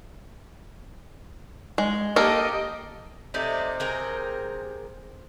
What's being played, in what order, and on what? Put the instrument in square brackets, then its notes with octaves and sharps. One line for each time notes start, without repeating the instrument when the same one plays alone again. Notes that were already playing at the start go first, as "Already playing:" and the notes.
[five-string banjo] G#3
[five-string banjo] A#3 A4 A#4 [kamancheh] G4 D#5
[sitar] C3 [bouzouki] A3 D#4 D5
[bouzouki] G#4 A#4 G5